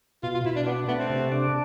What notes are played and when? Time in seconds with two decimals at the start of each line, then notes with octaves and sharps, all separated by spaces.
0.23 B2 F4
0.34 F4
0.45 B2 E4
0.56 D4
0.67 B3 D4
0.88 A3 B3
0.99 C4
1.10 C3
1.32 D4